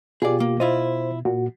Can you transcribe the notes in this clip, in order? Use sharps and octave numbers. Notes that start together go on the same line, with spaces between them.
B2 F4 G4 G#4 D5
A#3
E4 F4 C5 D#5
A#2 F#4